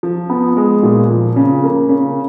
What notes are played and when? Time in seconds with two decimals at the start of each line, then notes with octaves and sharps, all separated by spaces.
0.03 F3
0.30 B3
0.57 G#3
0.83 A#2
1.10 F3
1.36 C#3
1.64 A#3
1.89 C#3